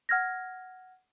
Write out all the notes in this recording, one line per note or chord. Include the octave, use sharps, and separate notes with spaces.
F#5 F6 G#6 A#6